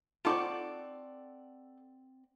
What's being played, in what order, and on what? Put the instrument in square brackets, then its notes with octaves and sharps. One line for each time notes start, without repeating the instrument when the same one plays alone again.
[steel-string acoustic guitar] C4 D5 F#5 [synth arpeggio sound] D#4 F4 [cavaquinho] A4 C#6 D6